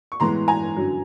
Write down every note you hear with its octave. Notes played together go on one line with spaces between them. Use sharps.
C#6
A2 E3 G#3 B3 A#5 C6
G#5 A#5
F#2 D3 F#3